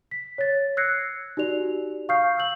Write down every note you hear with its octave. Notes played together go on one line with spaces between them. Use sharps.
B6
C#5 A6
E6 F#6 G#6 A#6 C7 C#7
D#4 F#4 G4 D5 F7
F5 C#6 D#6 F6 G6 C7
E6 G6 F#7